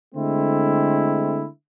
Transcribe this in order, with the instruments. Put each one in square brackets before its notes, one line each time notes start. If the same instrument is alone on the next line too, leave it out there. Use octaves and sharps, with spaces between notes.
[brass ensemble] D3 G#3 A3 C4 E4